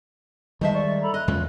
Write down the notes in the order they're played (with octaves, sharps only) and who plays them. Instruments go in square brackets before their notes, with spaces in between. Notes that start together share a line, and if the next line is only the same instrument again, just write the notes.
[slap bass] D#3 G#3 [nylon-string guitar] G3 C5 E5 [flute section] D#5 A5
[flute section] D5 C#6
A4 A#5 B5
[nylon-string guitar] D#5 [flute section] F#6
[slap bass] E2 G#3 C#4 [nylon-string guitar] F4